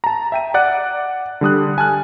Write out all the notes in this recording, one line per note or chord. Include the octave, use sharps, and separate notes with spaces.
A5 A#5
E5 G5 D#7
D5 F#5 F#6
D3 G3 D#6 F#6
G#5 A5 F6 F#6